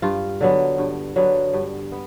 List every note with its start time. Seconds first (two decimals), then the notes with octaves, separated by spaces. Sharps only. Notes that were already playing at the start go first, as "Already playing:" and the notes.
0.02 G2 F4
0.41 D3 F#3 B3
0.78 G2
1.16 D3 F#3 B3
1.53 G2
1.92 B3